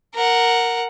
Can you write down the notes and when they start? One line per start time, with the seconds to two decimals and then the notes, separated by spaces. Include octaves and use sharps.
0.15 A#4 F#5